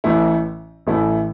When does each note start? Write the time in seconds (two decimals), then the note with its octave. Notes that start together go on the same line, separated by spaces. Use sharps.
0.04 A1 A2 E3 A3 E4
0.87 A1 A2 E3 A3 E4